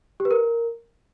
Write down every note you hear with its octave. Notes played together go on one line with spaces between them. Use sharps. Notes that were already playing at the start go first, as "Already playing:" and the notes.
G4
B4
A#4